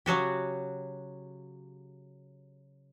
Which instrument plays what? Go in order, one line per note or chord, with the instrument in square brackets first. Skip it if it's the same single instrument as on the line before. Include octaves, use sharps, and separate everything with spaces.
[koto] C#3 F#3 F#4 G4